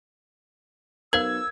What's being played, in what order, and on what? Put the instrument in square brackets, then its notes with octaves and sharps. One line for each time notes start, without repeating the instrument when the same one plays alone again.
[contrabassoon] B1 [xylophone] A#4 C5 F5 [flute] E6 [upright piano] G#6